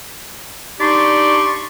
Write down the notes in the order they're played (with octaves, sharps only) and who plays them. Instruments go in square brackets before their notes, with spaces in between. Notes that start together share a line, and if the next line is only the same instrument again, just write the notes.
[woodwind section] D4 D#4 G4 D5 C6 C#6